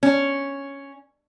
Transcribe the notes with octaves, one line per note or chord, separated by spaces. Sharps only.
C#4